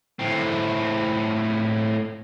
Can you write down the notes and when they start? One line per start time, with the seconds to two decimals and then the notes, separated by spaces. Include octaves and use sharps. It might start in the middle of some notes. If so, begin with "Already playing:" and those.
0.20 A2 C4